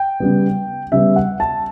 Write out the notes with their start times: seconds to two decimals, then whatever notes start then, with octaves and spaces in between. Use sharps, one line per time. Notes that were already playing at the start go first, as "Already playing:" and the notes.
Already playing: G5
0.20 C#3 G3 B3
0.92 C#3 G3 B3 E5
1.16 F#5
1.40 A5